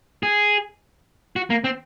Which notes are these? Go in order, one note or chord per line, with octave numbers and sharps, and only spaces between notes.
G#4
F#4
A#3
C4